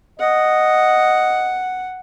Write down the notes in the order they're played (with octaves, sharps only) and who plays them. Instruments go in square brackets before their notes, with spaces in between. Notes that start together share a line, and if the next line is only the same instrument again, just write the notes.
[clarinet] D#5 [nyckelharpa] F#5